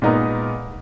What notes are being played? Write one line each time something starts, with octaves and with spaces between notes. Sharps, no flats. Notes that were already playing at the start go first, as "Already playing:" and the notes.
A#2 G#3 B3 D#4 A#4